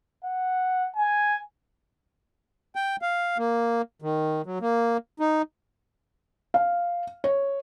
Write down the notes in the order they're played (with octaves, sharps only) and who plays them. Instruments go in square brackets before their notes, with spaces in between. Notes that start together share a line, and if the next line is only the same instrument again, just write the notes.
[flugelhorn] F#5
G#5
[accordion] G5
F5
A#3
D#3
F#3
A#3
D#4
[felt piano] F5
C#5